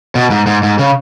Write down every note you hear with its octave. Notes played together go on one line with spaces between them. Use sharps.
B2
G#2
G#2
G#2
C#3